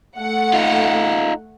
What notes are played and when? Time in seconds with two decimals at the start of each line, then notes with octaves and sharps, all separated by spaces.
0.18 A3 F#5
0.53 D#4 F4